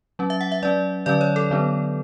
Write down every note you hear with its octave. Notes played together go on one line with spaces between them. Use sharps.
F#3 C#4
E5
F#5
E5
F#3 C#4 D5
D3 F#3 C#4 D5
C#5
A4
D3 F#3 B3 D4